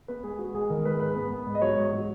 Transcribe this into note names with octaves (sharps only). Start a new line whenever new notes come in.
B3 B4
G#3 G#4
B3 F#4
G#3 G#4
D#3 A#4
G#3 B4
G#2 B4
B3
B3
G#2
D#5
F#3 C#5
G#2
F#3